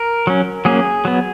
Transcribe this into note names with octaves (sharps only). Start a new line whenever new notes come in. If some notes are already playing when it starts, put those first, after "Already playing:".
Already playing: A#4
F#3 C#4
F#3 A#3 C#4 G#4
F#3 B3